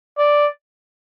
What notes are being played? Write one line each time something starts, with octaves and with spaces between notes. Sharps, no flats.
D5